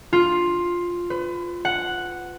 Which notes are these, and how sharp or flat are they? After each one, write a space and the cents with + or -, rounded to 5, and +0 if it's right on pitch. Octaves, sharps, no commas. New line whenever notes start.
F4 +5
B4 +35
F#5 +0